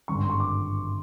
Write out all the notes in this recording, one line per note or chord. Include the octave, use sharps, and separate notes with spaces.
G#1 G2 D3 C#6
C6
C#6
D6